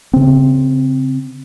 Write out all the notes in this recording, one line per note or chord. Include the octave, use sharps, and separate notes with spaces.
C#3 C4